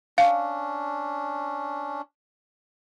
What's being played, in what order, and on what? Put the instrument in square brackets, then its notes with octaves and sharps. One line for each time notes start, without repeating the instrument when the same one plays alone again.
[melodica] C#4 D4 [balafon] F5